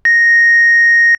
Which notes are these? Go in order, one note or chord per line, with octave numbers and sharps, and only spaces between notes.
A#6